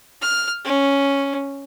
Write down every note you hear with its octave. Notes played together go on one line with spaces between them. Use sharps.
F6
C#4